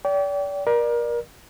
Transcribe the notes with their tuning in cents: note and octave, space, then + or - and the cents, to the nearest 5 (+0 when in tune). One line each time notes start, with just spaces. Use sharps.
D5 -40 G5 -15
A#4 +25 D5 +20